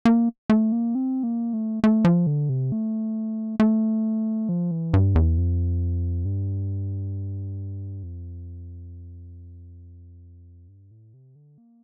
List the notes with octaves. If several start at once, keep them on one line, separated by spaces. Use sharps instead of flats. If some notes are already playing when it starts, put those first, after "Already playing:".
A#3
A3
A#3
C4
A#3
A3
A3
F3
D3
C3
A3
A3
F3
E3
G2
E2
F2
G2
F2
G2
A2
C3
D3
A#3